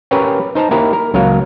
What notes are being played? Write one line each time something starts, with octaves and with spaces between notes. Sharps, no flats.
C#4 G4 A#4 B4 C#5 G5
D#4 C5 A5 A#5
A#3 D#4 E4 G4 A#4
A#4
C#2 F#3 A#3 A#4 F5